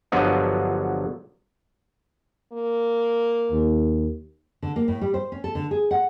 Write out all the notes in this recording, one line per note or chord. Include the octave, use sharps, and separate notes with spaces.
G1 D3 F3 F#3 B3 D#5
A#3
D#2
D3
A#3
A2
G3
C5
C#4
A4
D3
G#4
F#5